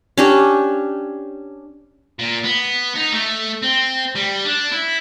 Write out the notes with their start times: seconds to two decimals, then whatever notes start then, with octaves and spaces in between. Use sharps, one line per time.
0.17 C#4 D4 G4
2.19 A#2
2.44 B3
2.95 D#4
3.12 A3
3.62 C4
4.15 G3
4.45 D4
4.72 E4